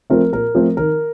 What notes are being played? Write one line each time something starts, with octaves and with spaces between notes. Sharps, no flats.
F3 A3 C4 A#4
A#2 A#4
F3 A3 C4
D#3 A#4